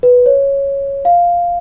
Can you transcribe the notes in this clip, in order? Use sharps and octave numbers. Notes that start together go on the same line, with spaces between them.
B4
C#5
F5